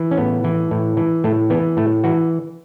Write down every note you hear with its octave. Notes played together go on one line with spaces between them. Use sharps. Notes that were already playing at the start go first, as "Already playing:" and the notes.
Already playing: E3
C#4
A2 B3
E3
A2
E3
A2 A3
E3 B3
A2 A3
E3 F#4